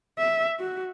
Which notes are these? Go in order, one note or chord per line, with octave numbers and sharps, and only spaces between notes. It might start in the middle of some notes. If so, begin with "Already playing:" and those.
E5
F#4